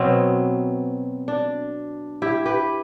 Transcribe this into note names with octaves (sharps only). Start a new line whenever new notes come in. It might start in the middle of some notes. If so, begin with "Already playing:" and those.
Already playing: B2 F#3 B3 C4
D4
E4 G4
G4 B4